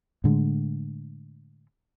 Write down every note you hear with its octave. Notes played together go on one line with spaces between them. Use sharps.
A2 D3 G#3